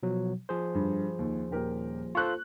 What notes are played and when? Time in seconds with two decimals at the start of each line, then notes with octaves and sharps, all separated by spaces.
0.03 B2 F3 F#3
0.49 F3 G#4 C5
0.75 G2
1.19 D#2
1.51 D#1 G4 A#4
2.15 F4 A4 C5 C#6 F#6